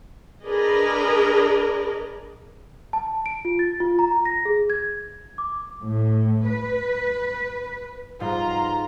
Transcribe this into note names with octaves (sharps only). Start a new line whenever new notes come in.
D4 G#4 A#4 B4 D5 D#5
A5
D7
F4
A6
F4
A#5
A#6
G#4
G#6
D6
A2
B4
G#2 G3 B3 F4 A#5